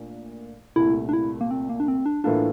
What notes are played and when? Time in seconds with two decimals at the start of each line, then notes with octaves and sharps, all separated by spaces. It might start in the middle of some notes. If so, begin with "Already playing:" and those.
Already playing: A#2 A3 D4
0.76 C2 A#2 A3 E4
1.09 D4
1.13 E4
1.41 A#3
1.51 C4
1.69 A#3
1.80 D4
1.88 C4
2.06 D4
2.24 A2 E3 A#3 D4 F4 A4